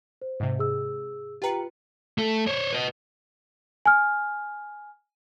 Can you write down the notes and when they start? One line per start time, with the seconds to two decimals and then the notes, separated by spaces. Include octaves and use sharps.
0.22 C5
0.40 G#2 C3
0.59 G#4 E6
1.42 F4 G4 B4 G5 A#5 C#7
2.18 A3 A4
2.47 C5 C#5
2.73 B4 D#5
3.86 G#5 F6